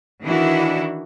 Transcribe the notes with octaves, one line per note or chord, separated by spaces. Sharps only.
D#3 E3 D4 E4 F#4